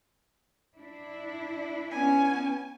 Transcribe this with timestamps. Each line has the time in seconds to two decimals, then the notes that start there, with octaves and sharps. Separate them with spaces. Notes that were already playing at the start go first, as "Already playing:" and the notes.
0.77 D4 E4
1.91 B3 C#4 G#5